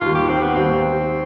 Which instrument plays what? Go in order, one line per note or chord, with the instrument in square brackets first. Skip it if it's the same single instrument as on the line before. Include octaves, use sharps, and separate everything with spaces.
[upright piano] D#2 D#3 G3 [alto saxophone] F4
[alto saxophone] G4
C4
B3
[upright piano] D#2 D#3 G3 [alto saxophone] C4